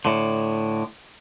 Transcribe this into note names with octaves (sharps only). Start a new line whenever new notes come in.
A2 D3